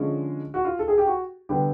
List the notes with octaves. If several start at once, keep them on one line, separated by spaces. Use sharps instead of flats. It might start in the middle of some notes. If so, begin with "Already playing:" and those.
Already playing: D3 F3 G#3 C#4
F#4
F4
A4
G#4
G4
F#4
D3 G3 B3 G4